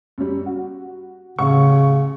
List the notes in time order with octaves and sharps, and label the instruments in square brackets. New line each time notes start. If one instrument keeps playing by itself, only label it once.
[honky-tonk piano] F#2 G3
F#4
[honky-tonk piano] A1 F#5 C#6 [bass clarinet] C#3